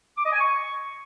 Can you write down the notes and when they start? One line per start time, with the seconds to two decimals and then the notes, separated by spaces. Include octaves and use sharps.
0.18 D6
0.25 D#5
0.33 G#5
0.40 C#6